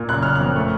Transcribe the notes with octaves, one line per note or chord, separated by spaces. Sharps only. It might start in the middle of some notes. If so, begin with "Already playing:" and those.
Already playing: A#2
F#1 F#6
F#1 F6
F#6
F2
A3